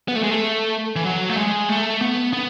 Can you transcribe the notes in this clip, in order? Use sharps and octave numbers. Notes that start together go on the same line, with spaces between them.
B3
A3
G#3
A3
E3
F#3
A3
G#3
A3
B3
B3